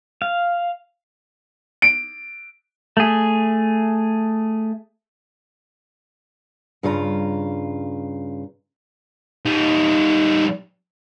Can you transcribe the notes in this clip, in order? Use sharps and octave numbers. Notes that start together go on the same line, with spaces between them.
F5
D7
A3 G#4
G2 C#3 F4 A#5
G3 D#4